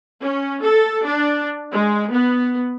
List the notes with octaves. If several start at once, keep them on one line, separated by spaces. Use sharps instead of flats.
C#4
A4
D4
G#3
B3